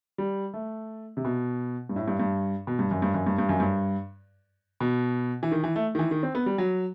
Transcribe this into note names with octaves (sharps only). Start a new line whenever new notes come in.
G3
A3
C3
B2
G2
A2
G2
G2
B2
G2
F#2
G2
F#2
G2
G2
F#2
G2
B2
E3
D#3
E3
A3
D#3
E3
D#3
C4
B3
G3
F#3